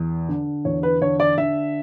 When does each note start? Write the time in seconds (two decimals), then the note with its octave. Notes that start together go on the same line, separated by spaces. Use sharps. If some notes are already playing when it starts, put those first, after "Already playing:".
Already playing: E2
0.29 D3
0.65 E2 C#5
0.83 B4
1.01 D3 C#5
1.20 D5
1.38 D3 E5